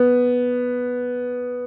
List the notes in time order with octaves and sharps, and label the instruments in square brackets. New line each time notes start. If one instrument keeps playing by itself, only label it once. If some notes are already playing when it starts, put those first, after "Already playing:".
Already playing: [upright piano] B3